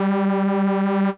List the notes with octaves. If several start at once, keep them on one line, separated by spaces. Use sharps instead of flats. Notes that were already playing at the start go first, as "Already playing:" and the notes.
Already playing: G3